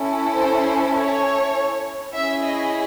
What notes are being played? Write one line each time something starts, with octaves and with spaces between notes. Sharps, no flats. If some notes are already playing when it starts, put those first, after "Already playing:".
Already playing: C#4 E4 A4
C5
C#5
C#4 E4 G#4 E5
D#5